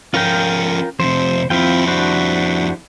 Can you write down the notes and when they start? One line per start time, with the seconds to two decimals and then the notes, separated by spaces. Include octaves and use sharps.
0.14 F3 C#4 F4 A#4 G5
1.00 F2 C3 C5
1.50 F2 C4 E4 F4 G5
1.87 D4 F#4 C5